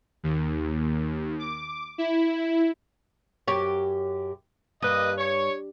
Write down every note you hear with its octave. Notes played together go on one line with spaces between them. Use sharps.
D#2
D6
E4
F#2 G4 C#5
G2 A#3 B4 D#5
C#5